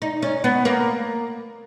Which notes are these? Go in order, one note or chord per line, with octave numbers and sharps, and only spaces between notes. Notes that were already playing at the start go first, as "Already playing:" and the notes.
D#4
C#4
B3
A#3